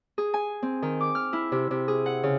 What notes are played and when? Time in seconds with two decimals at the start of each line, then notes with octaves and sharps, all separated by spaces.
0.18 G#4
0.34 G#5
0.63 C4
0.82 D#3
1.01 D6
1.15 F6
1.33 E4
1.52 C3
1.71 C3
1.88 G#4
2.06 F#5
2.23 C#3